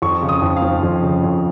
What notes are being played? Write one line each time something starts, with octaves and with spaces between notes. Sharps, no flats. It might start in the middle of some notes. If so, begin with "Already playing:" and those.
F2 C#6
C#3
D#6
F2
F5
F3
F2
C#3
F2